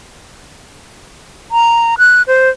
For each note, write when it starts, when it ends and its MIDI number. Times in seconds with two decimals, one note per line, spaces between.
1.52 1.95 82
1.98 2.23 90
2.27 2.50 72